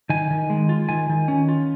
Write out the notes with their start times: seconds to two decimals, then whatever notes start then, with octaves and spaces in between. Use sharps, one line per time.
0.10 D#3 G#5
0.30 D#3
0.50 G#3
0.69 F4
0.89 D#3 G#5
1.09 D#3
1.28 C#4
1.49 F4